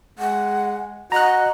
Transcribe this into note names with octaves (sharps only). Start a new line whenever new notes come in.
G#3 F#5
F#4 D#5 A#5 F#6